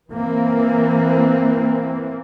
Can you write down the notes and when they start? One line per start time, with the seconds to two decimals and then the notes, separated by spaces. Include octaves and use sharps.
0.13 E3 A#3 C4